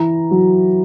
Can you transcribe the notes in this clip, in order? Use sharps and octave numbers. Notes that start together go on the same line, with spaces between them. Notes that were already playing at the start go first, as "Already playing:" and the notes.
Already playing: E3 E4 A#5
F#3